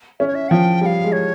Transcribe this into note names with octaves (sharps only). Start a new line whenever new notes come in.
C#4 E5
C#5
E5
F3 G5
G3 G5
F5
G#3
C#5